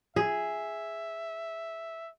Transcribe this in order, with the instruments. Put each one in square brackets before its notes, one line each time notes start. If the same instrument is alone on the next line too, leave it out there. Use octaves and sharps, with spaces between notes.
[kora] G#4 [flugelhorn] E5